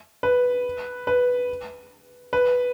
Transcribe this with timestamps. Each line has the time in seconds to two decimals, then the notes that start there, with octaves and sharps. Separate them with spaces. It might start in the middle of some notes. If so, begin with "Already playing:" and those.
0.23 B4
1.07 B4
2.33 B4